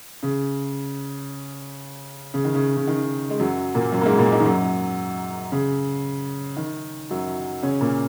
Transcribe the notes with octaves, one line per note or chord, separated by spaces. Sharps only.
C#3
C#3
D#3
C#3
C#3
D#3
G#3
F#2 F#3
A#2 A#3
F#2 F#3
A#3
G#2 G#3
A#2 A#3
G#2 G#3
D#3
F#2 F#3
C#3
D#3
F#2 F#3
C#3 C#4
A#2 A#3